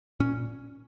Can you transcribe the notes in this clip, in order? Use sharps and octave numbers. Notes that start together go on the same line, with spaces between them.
A#2 C#4